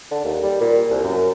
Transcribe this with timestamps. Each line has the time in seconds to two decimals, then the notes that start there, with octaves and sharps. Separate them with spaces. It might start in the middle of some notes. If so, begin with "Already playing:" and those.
0.11 D3
0.24 D#2
0.43 G3
0.61 A#2
0.90 C2
1.04 F#2